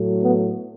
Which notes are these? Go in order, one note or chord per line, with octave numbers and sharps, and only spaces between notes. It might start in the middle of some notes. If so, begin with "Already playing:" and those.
Already playing: A2 F#3 A3
B3